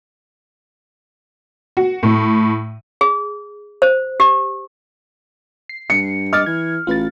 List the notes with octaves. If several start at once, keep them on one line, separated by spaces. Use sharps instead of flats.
F#4
A2
G#4
C5
G4
C7
G2 C#7
D#5 D6 F6 A6
E3 G#6
A1 F4 B4 A6